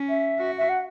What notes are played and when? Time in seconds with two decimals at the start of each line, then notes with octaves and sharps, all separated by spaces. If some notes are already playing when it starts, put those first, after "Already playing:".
Already playing: C#4
0.09 E5
0.39 F#4
0.58 E5
0.69 F#5